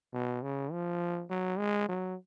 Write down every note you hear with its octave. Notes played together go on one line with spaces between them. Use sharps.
B2
C#3
F3
F#3
G#3
F#3